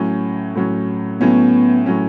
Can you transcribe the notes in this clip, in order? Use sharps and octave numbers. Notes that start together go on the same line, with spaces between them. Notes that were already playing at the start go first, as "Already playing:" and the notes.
Already playing: A2 F#3 C#4
A2 F#3 C#4
A2 F#3 B3 C#4
A2 F#3 C#4